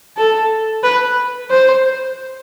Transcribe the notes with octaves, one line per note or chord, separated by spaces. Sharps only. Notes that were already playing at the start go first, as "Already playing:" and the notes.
A4
B4
C5